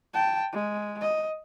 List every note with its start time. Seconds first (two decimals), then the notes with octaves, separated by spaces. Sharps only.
0.14 G5 A5
0.52 G#3
1.01 D#5